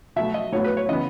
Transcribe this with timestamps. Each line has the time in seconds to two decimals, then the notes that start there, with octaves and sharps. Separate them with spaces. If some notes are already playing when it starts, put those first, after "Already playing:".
0.16 B2 F#3 A3 E5
0.34 D#5
0.52 A2 F#3 B3 C#5
0.64 B4
0.77 C#5
0.89 C#3 E3 B3 D#5